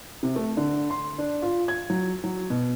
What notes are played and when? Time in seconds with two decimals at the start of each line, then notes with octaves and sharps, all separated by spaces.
0.23 C3
0.36 A3
0.57 D3
0.90 C6
1.18 D4
1.42 F4
1.68 G#6
1.90 F#3
2.24 F#3
2.50 B2